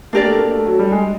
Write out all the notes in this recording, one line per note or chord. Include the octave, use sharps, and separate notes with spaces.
A#3 D4 G4 A#4 D5
A3
A#3
A3
F#3
G3
G#3